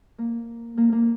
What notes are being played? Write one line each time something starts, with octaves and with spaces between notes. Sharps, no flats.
A#3
A#3
A#3